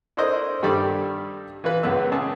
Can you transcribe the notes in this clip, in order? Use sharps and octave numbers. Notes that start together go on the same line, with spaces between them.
D4 E4 A4 A#4 C5 D#5
G2 D#3 G3 A4 D5 E6
E3 F4 B4
C#2 F#2 B3 B4 E6
C#2 C#3 G#4 A5 E6